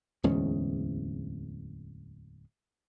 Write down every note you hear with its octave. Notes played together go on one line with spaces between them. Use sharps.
D1 E2 G#3 C#4